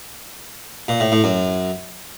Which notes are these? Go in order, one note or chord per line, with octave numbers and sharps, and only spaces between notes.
A#2
A2
A2
F#2